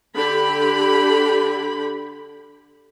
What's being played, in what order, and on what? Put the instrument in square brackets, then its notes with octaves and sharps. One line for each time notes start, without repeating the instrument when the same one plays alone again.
[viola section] D3 G4 B5